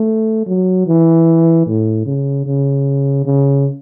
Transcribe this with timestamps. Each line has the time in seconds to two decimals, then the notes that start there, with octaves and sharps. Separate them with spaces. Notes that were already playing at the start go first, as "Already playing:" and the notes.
Already playing: A3
0.47 F#3
0.87 E3
1.67 A2
2.06 C#3
2.47 C#3
3.26 C#3